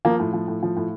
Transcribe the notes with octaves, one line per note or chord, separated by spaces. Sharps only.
F3 A#3
A2
F3
A2
F3
A2